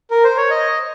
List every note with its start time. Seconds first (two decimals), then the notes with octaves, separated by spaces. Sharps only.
0.11 A#4
0.24 C5
0.37 C#5
0.50 D#5